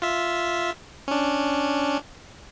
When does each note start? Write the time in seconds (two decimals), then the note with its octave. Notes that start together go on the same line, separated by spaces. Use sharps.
0.02 F4 E5
1.08 C#4 D4